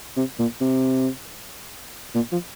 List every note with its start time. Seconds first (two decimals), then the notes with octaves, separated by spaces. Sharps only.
0.17 C3
0.39 A#2
0.61 C3
2.15 A#2
2.32 F3